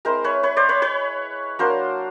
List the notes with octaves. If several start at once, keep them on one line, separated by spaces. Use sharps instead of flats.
G#3 C4 E4 A#4 C5
B4 C#5
B4 C#5
C5 D5
B4 C#5
B4 C#5
F#3 A#3 D4 A#4 C5